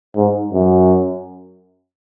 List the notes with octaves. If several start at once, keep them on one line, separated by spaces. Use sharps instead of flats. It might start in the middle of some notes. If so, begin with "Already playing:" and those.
G#2
F#2